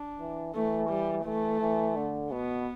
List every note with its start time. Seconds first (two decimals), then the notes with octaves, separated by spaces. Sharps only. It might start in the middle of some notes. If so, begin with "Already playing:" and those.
Already playing: D4
0.19 E3
0.55 E3 A3
0.90 G3
1.25 E3 A3
1.61 E3
1.96 D3
2.32 B2 B3